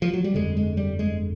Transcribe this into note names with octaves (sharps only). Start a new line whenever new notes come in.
F3
F#3
G3
G1 F2 D3 G#3
G#3
G3
G#3